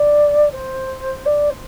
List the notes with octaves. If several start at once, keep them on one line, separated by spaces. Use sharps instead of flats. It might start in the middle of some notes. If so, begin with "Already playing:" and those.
Already playing: D5
C5
D5
C5